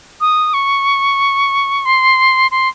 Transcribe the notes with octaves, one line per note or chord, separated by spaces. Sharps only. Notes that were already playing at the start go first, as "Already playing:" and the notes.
D#6
C#6
C6
C6